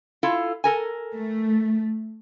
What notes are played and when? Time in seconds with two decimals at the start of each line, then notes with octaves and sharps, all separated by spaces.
0.23 E4 F4 A4
0.64 A4 A#4 G#5
1.16 A3